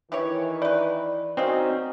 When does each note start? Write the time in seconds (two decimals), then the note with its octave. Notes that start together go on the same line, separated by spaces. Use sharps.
0.12 D#3 E3 E4 G4 C#5
0.62 E4 B4 D5
1.37 A#3 C4 C#4 D#4 F#4 D#5